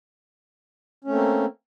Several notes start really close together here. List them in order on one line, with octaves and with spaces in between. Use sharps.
C#4 A3 C4 A#3